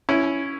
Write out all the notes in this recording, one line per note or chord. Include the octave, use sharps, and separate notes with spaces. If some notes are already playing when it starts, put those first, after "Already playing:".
C#4 E4